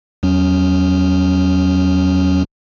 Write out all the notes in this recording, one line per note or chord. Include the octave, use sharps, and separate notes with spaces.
E2 F#3 C#4